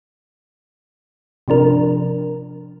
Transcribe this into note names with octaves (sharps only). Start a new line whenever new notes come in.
C3 F3 D4 A#4